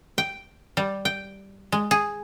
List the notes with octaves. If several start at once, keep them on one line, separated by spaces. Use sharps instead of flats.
G5
G3
G5
G#3
G#4